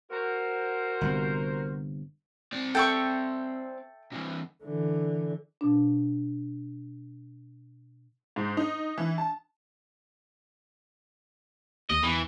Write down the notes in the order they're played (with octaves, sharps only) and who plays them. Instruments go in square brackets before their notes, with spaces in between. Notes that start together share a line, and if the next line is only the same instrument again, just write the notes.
[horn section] F#4 A#4 C5
[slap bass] G1 C3
[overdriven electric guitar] C4 D5
[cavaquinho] A4 E5 C#6 [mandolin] G5
[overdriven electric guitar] C3 E3
[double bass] D3 E3
[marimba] B2 D4
[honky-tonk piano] G#2
D#4
E3
A5
[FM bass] D#2 [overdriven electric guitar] D#5
[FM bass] E2 [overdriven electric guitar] E3